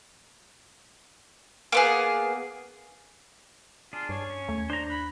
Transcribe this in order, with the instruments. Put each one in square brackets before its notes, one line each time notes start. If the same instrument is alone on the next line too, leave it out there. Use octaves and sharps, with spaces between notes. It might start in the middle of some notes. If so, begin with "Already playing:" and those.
[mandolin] A#3 B3 G#4
[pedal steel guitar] D4 G#4 [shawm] F4
[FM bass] G2 [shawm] C#5
[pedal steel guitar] C#4
[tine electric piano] D#2 [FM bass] A3
[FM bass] D4 [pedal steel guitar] C5 A#5
[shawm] B5 [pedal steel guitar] F#6